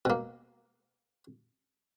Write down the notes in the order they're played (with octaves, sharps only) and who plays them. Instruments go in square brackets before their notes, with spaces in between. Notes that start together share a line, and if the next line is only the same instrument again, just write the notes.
[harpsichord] B2 A#3